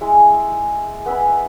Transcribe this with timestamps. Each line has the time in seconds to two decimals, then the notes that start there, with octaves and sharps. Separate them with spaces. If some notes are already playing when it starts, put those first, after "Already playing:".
0.01 G#3 E4
1.06 B3 E5 G#5 B5